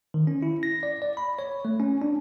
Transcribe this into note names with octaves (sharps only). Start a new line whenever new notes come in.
D#3
C#4
E4
A#6
D5
D5
B5
C#5
A3
C#4
D4